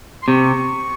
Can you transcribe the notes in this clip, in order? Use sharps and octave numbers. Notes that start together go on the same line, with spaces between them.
C6
C3 C#6